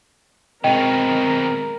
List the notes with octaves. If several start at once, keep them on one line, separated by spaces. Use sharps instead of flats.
B2 D#3 G#3 C4 A#4 D#5 G5